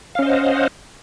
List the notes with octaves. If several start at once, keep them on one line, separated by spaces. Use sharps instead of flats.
C#4 C5 D#5 F5 F#5